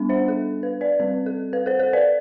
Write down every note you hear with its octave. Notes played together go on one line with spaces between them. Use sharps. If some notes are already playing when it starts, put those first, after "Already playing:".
Already playing: G3 B3 D4
C5 E5
A4
B4
B4 D5
G3 C4 B4
A4
B4
A4 C5
A4 C5
B4 D5